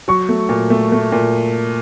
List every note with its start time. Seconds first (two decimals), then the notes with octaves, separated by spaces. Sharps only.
0.08 F#3 C#6
0.29 A3
0.49 A#2
0.70 A3
0.92 A3
1.12 A#2